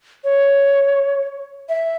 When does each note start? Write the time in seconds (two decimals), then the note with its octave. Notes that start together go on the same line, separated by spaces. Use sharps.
0.24 C#5
1.69 E5